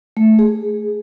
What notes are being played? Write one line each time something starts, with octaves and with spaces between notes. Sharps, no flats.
A3
G#4